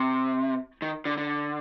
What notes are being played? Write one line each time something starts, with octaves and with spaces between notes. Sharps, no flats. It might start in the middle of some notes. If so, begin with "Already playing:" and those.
Already playing: C3
D#3
D3
D3